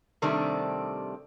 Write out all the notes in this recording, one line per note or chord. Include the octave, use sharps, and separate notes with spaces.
C3 D#3 G3 A3 C4 D4